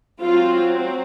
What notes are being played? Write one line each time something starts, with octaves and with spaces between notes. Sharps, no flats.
F#3 C4 F4